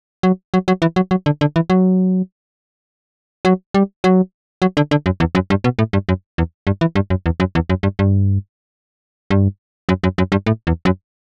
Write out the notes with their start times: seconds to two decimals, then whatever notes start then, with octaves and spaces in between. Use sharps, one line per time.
0.23 F#3
0.54 F#3
0.68 F#3
0.82 E3
0.96 F#3
1.11 F#3
1.26 D3
1.41 D3
1.56 E3
1.70 F#3
3.45 F#3
3.74 G3
4.04 F#3
4.62 F#3
4.77 D3
4.91 D3
5.06 F#2
5.20 E2
5.35 F#2
5.50 G2
5.64 B2
5.79 A2
5.93 G2
6.09 F#2
6.38 E2
6.67 G2
6.81 E3
6.95 G2
7.10 F#2
7.26 E2
7.40 F#2
7.55 E2
7.70 F#2
7.83 G2
7.99 G2
9.31 G2
9.89 F#2
10.04 F#2
10.18 F#2
10.32 G2
10.46 A2
10.67 E2
10.85 F#2